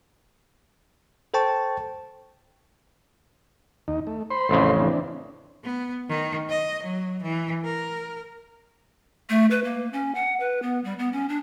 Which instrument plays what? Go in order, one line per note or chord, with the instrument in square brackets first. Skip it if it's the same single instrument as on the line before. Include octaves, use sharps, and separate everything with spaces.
[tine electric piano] A4 C5 G5 A5 C#6
[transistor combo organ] D#2 D#4
A3
C5 B5 C6
[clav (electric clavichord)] A1 F2 C#3
[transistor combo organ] E3 C4 D4
[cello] B3
D#3
D#5
F#3
E3
A#4
[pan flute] A3
B4
A#3
C#4
F#5
B4
B3
G3
B3
C#4
D4